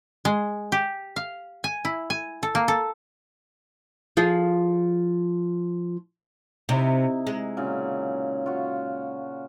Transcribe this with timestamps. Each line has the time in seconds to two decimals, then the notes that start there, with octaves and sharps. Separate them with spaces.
0.25 G#3
0.72 G4
1.16 F5
1.64 G#5
1.85 E4
2.10 G#5
2.43 A4
2.55 A#3
2.68 A4
4.17 F3 F4 G#4
6.69 C3 D#4 E4
7.27 G#3
7.57 A#2 C#3 F#3
8.46 F4 F#4